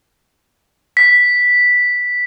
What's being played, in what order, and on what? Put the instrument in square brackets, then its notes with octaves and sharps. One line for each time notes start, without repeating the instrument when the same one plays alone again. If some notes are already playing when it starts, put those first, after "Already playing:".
[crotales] B6